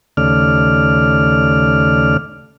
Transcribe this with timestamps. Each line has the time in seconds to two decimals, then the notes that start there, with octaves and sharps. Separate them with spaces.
0.17 D#2 C#3 A3 D5 F6